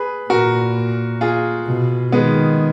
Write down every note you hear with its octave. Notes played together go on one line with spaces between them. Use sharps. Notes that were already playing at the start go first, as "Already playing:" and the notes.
Already playing: G#4 B4
A#2 F#4 A#4
F4 G#4
B2
D#3 G#3 B3